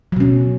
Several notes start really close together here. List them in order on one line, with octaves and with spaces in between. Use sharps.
F#3 B2 C#4